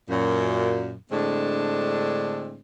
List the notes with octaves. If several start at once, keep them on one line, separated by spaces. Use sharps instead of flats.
F#2 A#2
A2 D3 G#3 C4 D4